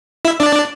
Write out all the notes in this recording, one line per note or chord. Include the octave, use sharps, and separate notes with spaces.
E4 E5
D4 D5